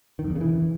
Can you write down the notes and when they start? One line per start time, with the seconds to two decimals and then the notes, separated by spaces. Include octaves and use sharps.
0.19 D#3
0.24 F2
0.30 E2
0.35 C#3
0.41 E3